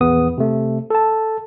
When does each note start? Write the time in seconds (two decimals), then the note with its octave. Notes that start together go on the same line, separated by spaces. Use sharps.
0.01 A#1 E2 B3 D#6
0.38 C3 A3
0.90 A4 A5